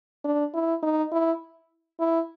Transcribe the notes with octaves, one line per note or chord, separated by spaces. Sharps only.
D4
E4
D#4
E4
E4